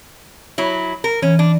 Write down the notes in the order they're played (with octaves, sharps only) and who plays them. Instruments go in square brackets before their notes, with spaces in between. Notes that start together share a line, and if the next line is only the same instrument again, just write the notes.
[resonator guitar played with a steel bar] F#3 E4
A#4
[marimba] E3 [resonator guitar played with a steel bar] C#4
[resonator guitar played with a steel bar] D4